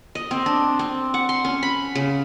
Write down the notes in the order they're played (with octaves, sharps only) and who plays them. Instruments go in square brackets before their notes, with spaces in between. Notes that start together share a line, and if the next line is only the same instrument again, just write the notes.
[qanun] D#5
C4
D4
C4
F#5
C6
C#4
B5
C#3